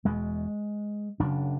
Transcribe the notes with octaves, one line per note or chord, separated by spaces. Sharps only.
E1 E2 B2 G#3
F#1 F#2 C#3 D4